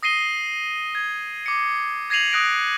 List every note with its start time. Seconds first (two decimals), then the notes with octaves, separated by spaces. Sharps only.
0.03 D#6 A#6 C7 D#7 G7
0.95 G#6
1.46 D6 C#7
2.10 G#6 A#6 C7 D#7 F7 F#7
2.32 D#6 F#6 A#6 D7